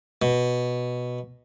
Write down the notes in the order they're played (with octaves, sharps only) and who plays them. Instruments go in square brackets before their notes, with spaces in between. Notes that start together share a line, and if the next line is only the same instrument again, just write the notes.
[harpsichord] B2